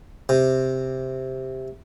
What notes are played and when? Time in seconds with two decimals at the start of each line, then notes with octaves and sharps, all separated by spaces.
0.29 C3